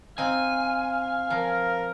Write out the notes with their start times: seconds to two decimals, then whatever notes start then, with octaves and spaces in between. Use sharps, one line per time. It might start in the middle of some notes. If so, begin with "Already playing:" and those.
0.18 C4 D#4 F5 G#5
1.30 F3 A#4